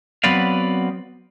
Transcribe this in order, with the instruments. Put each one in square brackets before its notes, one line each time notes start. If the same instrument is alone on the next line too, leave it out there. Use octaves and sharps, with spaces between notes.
[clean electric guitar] F#3 B3 C4 B4 D5 F5